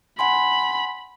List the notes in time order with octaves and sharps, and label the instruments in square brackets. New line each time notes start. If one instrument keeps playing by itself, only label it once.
[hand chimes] F#5 G#5 C6 [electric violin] B5